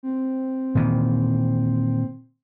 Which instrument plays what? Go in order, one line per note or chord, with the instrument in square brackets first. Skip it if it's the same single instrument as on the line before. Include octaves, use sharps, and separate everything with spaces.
[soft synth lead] C4
[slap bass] A#2 D#3 E3